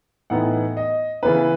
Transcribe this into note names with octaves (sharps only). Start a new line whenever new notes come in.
A2 E3 B3 D#4 F#5
D#5
C#3 E3 B3 E4 B4